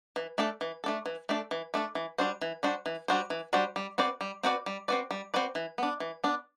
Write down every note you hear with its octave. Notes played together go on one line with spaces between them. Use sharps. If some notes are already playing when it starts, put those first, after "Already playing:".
E3
A3 D4 A4
E3
A3 D4 A4
E3
A3 D4 A4
E3
A3 D4 A4
E3
G3 D4 F#4 C5
E3
G3 D4 F#4 C5
E3
G3 D4 F#4 C5
E3
G3 D4 F#4 C5
G3
C4 F#4 B4 D5
G3
C4 F#4 B4 D5
G3
C4 F#4 B4 D5
G3
C4 F#4 B4 D5
E3
B3 D4
E3
B3 D4